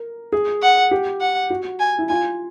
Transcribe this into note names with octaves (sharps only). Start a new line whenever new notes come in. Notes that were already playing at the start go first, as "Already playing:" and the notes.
Already playing: A#4
G#4
F#5
G4
F#5
F#4
G#5
E4
F4 G#5